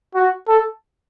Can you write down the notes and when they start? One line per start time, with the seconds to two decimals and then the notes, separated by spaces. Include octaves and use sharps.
0.15 F#4
0.48 A4